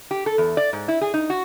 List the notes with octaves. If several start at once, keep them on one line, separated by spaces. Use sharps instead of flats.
G4
A4
E2
D5
G#2
E4
G#4
D#4
F#4